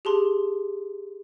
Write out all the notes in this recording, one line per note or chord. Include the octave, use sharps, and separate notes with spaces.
G4 G#4 A5 C6